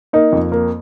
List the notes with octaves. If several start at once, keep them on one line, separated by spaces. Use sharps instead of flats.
A#3 D#4
F2
A#3